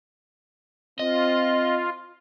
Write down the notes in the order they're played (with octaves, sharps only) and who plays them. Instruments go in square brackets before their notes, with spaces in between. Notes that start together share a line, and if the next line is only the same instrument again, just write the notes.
[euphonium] C4 [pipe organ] F4 [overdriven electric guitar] D#5